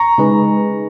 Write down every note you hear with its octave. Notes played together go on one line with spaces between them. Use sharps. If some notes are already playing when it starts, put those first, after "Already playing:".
Already playing: A#5 C#6
C#3 G#3 D#4 G#4 B4